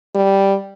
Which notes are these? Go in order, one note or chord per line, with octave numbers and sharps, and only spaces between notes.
G3